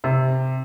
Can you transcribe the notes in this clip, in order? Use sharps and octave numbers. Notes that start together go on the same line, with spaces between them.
C3